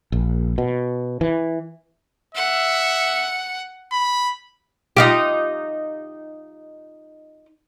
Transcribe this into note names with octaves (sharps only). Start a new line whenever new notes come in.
A#1
B2
E3
E5 F#5
B5
D#4 F4 G4